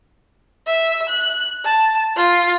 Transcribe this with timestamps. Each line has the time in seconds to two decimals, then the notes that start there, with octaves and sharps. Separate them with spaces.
0.66 E5
1.09 F#6
1.65 A5
2.16 F4